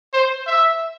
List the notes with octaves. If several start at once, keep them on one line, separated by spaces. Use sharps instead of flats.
C5
E5